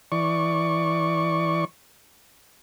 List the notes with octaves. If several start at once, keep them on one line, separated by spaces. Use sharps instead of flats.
E3 D5 C#6